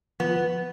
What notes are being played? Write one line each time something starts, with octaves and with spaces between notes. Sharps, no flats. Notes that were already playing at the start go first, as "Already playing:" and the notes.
F3 B3